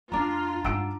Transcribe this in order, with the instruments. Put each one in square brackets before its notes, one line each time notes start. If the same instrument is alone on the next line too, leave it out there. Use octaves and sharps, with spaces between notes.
[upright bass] F2 [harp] D4 A#5 [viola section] F4
[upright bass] G2 D#4 [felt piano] F#5 E6 D7